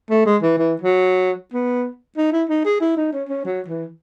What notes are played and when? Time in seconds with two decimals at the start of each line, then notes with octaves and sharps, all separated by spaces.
0.10 A3
0.26 G#3
0.42 E3
0.58 E3
0.81 F#3
1.53 B3
2.17 D#4
2.33 E4
2.49 D#4
2.65 G#4
2.81 E4
2.97 D#4
3.13 C#4
3.29 C#4
3.45 F#3
3.68 E3